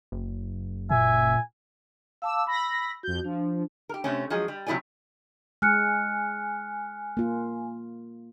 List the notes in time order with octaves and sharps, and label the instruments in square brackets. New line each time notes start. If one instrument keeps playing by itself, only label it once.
[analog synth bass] F#1
[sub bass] A#2 [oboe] E5 [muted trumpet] G#5
[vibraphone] F5 A5 D6 [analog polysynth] E6
[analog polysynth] B5 A#6 [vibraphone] E6
[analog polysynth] F2 G6 [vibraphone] F#4
[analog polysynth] F3 [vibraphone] D4
[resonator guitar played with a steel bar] G4 A#4
C3 A3 C#4
F3 F#3 G#3 G#4
G3
C3 F#3 E4 G#4 D5 G#5
[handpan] G#3 [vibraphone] G#5 [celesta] F6 F#6 C#7
[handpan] A#3 F4